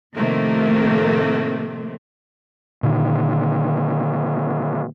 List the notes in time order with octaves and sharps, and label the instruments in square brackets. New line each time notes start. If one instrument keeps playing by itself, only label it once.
[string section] A2 C3 D#3 F3 A3 A#3
[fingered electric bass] A#2 D3 D#3